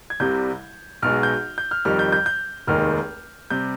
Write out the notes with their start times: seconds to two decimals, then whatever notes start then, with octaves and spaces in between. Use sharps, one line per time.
0.10 G#6
0.20 C2 C3 G3 G6
1.02 B1 B2 G#3 F6
1.23 G6
1.58 G6
1.71 F6
1.85 F2 D#3 G3 F6
1.99 G6
2.12 G6
2.26 G6
2.67 F1 D#2 D#3 G#3 F6
3.50 C3 G3 G6